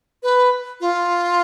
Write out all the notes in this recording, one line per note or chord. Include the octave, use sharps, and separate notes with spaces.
B4
F4